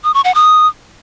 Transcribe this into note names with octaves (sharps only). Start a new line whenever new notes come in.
D#6
C#6
F#5
D#6